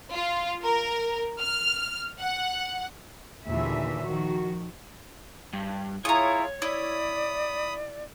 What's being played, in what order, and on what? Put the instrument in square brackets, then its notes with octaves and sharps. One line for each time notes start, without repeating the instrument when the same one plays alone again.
[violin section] F4
A#4
F6
F#5
[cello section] D#2 A#2 D3 E3 G#4 E5
D#3 F3 F#4
[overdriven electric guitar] G2
[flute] E4 [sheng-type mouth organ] F4 G#4 [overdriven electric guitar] C#5 [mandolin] A#5 D#6
[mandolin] E4 [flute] D5 [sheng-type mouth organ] B5 D#6